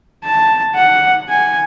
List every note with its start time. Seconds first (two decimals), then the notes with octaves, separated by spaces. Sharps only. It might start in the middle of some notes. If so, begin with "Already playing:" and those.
0.24 A5
0.75 F#5
1.29 G#5